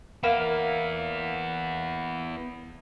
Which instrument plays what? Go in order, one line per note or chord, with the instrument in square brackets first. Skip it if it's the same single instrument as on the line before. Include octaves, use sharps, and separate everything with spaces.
[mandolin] A#3 F5 B5 [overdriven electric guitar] B3 E4